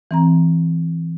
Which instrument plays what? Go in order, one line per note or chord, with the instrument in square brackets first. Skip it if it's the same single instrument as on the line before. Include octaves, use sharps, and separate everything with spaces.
[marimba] E3 C4 A#5